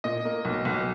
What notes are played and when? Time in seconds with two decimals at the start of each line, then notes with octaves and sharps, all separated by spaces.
0.04 A#2 D#5
0.25 A#3
0.45 B1
0.65 B1